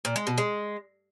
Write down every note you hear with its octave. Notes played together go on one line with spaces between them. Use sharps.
A#2
G#3
B2
G#3